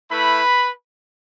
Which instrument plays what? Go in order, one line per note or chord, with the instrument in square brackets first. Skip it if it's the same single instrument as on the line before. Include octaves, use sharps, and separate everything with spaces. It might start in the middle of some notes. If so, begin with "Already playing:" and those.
[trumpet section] A3 E4 B4 B5